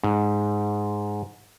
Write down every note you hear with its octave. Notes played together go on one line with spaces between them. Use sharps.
G#2